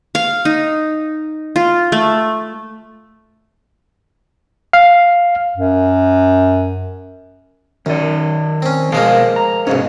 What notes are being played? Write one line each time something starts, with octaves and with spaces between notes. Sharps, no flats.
F5
D#4
F4
A3
F5
F#2
F#2 D#3 D5
C4 C#4
B2 F3 G#3 A#3 A#4 F5
A#5
B1 G#2 C3 C#4